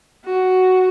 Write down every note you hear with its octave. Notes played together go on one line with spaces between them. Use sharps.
F#4